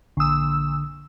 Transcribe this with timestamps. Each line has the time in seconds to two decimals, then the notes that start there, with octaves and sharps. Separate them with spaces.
0.17 A#1 D3 D#6 E6